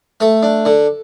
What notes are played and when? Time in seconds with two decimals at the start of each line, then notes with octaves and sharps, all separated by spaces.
0.20 A3 A4
0.43 D4
0.65 D3